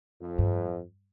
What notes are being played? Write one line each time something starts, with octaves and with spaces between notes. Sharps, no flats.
F2
G2